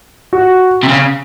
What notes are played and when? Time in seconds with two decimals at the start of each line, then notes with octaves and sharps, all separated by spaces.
0.33 F#4
0.83 C3
0.89 C#3